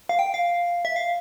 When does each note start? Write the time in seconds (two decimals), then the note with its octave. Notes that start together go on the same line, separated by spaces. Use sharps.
0.09 F5
0.19 G5
0.34 F5
0.85 E5
0.96 F5